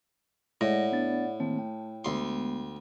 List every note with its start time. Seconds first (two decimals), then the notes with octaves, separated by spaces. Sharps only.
0.61 A2 G#3 D5 F#5 A#6
0.92 B3 D4 A6
1.40 D#3 A3 A#3 C4
1.59 G5
2.05 D2 G#3 B3 C6